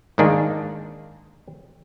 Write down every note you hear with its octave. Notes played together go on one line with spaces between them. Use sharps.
G#2 D#3 A#3 D4 G#4